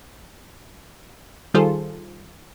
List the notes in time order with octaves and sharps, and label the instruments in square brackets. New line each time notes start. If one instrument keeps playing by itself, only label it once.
[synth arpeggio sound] D#3 G3 F4 G#4 A4 C5